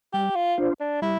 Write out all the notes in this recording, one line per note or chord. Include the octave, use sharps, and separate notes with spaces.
G3 G4
F4
D4 F4 C5
D4
G3 E4